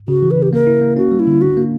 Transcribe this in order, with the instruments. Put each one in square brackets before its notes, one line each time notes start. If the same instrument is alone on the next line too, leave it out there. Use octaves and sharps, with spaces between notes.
[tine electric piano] C#3 [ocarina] F#4
[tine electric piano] E3
[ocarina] B4
[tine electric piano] C#3 [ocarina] G4
[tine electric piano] A#3 [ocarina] A#4
[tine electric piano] E4
A#3
[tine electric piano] C#4 [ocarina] F#4
[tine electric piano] G3
[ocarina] E4
[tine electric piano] D3
[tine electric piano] D4 [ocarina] F#4
[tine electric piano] A#3